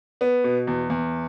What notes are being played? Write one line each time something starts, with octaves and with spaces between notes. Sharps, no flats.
B3
B2
E2
E2